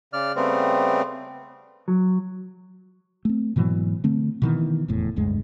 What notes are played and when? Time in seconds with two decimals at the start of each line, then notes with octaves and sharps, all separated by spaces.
0.13 C#3 D5 F6
0.36 C#3 G3 A3 B3 C4
1.88 F#3
3.25 A3 C4
3.56 G#2 B2 E3 F#3
4.04 D3 A3 C4
4.42 B2 D#3 E3
4.88 F1 E2 A2
5.16 F1 D2 G2 G#3